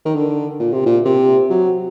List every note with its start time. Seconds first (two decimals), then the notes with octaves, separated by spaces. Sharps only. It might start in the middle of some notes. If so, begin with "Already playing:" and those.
0.06 D#3
0.15 D3
0.60 A#2
0.73 C3
0.86 A#2
1.05 C3
1.50 F#3